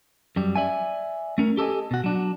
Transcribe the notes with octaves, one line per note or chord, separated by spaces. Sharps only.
F#2 G3
D5 E5 G#5
A3 C#4 A#4
G4 A4 C#5 D#5 G#5
B2 F#4
F#3 D4